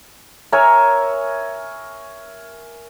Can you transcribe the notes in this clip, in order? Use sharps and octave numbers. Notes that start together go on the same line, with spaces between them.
A#4 C#5 E5 G#5